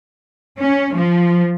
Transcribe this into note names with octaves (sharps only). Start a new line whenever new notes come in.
C#4
F3